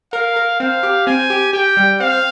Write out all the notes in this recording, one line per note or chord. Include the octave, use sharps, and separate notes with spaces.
A#4 F5
A#4
C4 F5
G4
C4 G#5
G4
G4 G5
G3
C4 F5